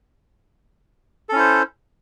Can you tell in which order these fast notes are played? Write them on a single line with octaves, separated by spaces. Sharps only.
A4 C#4 E4 C5